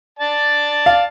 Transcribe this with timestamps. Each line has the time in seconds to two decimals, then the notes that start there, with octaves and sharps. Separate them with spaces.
0.19 D5 A5
0.86 F5